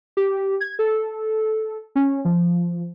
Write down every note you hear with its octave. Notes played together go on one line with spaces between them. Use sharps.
G4
G#6
A4
C#4
F3